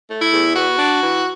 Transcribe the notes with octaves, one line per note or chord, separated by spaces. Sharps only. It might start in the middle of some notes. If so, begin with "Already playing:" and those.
A3
E4
E2
B3 F#4
D4
E3